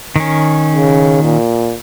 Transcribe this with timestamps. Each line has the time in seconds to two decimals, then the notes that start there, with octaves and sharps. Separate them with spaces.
0.16 D#3 C#4
0.75 C#3
1.23 A#2